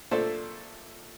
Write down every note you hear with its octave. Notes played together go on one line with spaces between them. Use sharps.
A#2 A3 D4 A4 C5